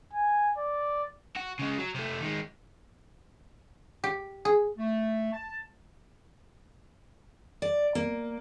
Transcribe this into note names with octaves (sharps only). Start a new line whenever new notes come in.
G#5
D5
F#4
C#3 G#3
F#3
C3 A3
D#3 G#3
G4
G#4
A3
A5
D5
A#3